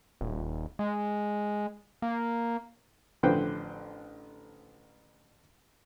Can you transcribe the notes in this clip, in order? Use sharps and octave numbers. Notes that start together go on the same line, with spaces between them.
D#1
G#3
A#3
A1 D3 F3 B4 C5 G5